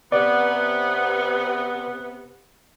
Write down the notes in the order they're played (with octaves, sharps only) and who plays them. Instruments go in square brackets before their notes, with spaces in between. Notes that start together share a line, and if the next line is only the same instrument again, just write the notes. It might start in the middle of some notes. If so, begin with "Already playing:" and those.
[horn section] C3 B3 [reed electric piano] D5